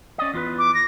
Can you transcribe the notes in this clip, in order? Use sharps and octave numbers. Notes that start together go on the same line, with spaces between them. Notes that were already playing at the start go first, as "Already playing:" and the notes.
C#4 D5 D#5
E2 F4 B4
D6
A#6